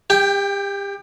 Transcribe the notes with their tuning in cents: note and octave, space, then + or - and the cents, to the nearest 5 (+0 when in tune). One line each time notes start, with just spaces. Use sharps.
G4 +30 G5 +0